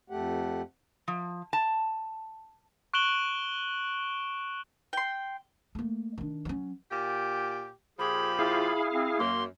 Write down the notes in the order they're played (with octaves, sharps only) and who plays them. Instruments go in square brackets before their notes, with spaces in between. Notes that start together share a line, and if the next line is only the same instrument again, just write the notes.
[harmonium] F2 A3 G4 F#5
[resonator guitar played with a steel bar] F3
A5
[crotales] C#6 F#6 D7 E7 F#7 G7
[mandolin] G5 C6
[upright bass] A3 A#3
D#3 D4
F#3 C#4
[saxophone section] A#2 G4
[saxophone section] A#2 F3 G4 [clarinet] G#4 [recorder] B5
[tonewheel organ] E4 G#4 F5 [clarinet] F4
[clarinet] C4
[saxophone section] F#2 [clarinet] A#3 [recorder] C6